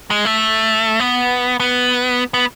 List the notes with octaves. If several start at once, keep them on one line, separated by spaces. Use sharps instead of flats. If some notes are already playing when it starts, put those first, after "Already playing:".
G#3
A3
B3
B3
B3